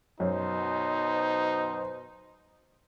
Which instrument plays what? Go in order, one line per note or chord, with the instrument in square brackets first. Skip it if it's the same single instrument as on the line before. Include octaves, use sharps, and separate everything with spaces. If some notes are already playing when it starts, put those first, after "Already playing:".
[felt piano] F#2 [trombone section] B2 C5 [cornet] D#4